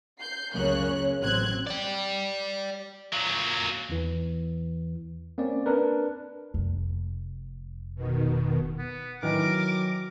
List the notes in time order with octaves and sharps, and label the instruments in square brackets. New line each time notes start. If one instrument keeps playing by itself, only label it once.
[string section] G6 C7
C#2 F#2 C#3 A#3 C#5 F#6
A1 F#3 C4 F#6 G#6
[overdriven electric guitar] D5 G5
[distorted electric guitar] A#2 F#3
[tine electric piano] E2 E3
A#3 C4 C#4 D5
D4 A#4 B4
[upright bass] F1
[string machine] B2 D#3
[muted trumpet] B3
[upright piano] D#3 E3 [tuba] F#3 [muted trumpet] A#4 [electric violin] D6